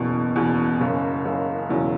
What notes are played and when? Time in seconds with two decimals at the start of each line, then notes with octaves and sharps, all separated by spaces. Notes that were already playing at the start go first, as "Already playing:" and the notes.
Already playing: F#1 E2 B2
0.36 F#1 E2 B2
0.80 F#1 F#2 C#3
1.25 F#1 F#2 C#3
1.69 E1 E2 C#3 F#3